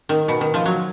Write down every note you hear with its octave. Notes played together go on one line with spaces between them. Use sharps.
D#3
B2
D#3
F3
F#3